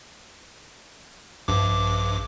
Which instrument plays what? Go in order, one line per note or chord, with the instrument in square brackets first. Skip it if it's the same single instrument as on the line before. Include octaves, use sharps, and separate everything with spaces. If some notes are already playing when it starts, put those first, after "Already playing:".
[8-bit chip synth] A#1 G2 D6